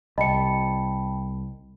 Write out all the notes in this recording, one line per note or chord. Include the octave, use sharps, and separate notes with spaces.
C2 D#5 G5 A5 B5 C#7